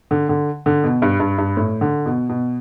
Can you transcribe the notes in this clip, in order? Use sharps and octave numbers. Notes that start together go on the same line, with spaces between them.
D3
D3
D3
B2
G2
G2
G2
A2
D3
B2
B2